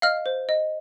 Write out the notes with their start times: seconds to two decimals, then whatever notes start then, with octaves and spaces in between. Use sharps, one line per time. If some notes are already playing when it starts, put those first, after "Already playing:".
0.02 D#5 F5 F6
0.26 C5
0.49 D#5